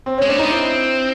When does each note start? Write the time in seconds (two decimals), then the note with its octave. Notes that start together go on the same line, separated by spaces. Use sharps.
0.06 C4
0.18 G#3 C#4
0.29 A3 D4
0.36 A#3
0.39 B3 D#4
0.49 C4 E4